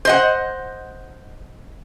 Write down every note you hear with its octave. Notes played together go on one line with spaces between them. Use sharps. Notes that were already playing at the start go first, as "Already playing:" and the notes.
C5 D#5 F#5